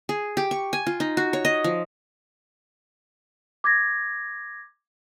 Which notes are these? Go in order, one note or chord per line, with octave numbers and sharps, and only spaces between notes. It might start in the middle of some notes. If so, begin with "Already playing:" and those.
G#4
G4
C#6
G#5
F4
D#4
F#4
C#5
D#5
F3
D6 G#6 A#6